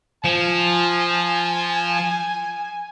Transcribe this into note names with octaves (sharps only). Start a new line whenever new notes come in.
F3 G#5